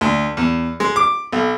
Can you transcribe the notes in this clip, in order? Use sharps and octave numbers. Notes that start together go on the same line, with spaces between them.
D2
E2
G#3
D6
B1